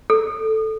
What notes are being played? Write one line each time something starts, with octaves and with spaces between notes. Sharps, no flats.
A4